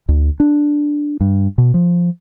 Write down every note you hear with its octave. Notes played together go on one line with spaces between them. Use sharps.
D2
D4
G2
B2
F3